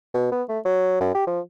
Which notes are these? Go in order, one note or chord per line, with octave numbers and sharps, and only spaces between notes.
B2
B3
A3
F#3
F#2
G4
F3